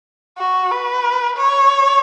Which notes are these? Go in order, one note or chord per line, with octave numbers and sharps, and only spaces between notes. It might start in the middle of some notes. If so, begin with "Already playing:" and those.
F#4
B4
C#5